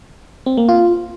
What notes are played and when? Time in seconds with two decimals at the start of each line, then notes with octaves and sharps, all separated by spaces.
0.46 C4
0.57 A#3
0.69 F4